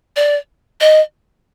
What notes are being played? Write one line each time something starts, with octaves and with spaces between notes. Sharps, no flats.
D5
D#5